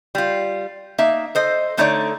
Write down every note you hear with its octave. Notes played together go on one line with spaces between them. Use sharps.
G3 F4
A#3 D#4 E5
A4 C5 D#5
D3 A3 D#4 A4 C#5 D5